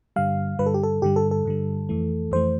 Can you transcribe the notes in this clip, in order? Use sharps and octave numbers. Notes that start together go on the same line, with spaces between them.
G2 D3 G3 F5
G2 D3 G3 B4
A4
G4
A4
G2 D3 G3 G4
A4
A4
G2 D3 G3
F2 E3 A3
F2 E3 A3 C5